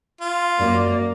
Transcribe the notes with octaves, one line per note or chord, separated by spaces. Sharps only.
F4
F#2 A#3 D5